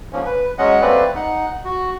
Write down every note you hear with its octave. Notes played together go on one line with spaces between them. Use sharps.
G#2 F3 A#3 C#4
B4
F#3 G#3 C#4 D#5 F#5
G3 A3 A#3 C4 B4 D5
D#4 F#5
F#4